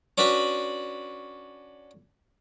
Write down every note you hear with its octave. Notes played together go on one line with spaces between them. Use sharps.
C#4 D4 F#4 B4 B5